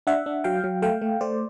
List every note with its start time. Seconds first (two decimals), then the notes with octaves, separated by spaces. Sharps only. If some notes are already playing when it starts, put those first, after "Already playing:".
0.07 D4 E5 F#5
0.26 D4
0.44 F#3 F5 G5
0.64 F#3
0.82 A3 F5 G5
1.02 A3
1.21 A3 C5 D5